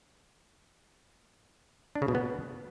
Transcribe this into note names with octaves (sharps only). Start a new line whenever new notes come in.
D4
C#3
B2
B3